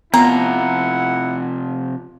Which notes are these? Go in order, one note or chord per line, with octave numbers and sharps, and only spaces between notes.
C3 F3 B3 E4 F4 F#5 A#5